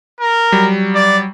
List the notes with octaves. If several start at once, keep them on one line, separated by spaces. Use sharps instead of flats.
A#4
F#3 G3
D5